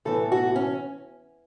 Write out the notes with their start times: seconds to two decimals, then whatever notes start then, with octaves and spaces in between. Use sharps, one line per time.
0.05 A2 E3 B3 A4
0.32 F#4
0.56 C#4